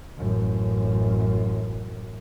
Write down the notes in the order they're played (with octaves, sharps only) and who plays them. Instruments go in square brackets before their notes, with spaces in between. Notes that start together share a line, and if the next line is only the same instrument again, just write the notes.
[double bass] A1 F#2